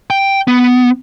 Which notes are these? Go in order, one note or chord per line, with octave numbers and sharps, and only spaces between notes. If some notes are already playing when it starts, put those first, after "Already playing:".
G5
B3